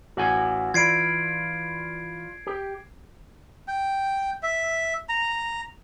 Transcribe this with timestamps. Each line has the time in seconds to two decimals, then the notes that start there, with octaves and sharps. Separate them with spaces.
0.17 A1 F#4 F#5 G#5
0.74 E3 F4 D5 B5 G#6 C7 D7
2.47 G4
3.68 G5
4.43 E5
5.09 A#5